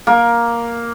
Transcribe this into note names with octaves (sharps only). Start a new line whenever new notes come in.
A#3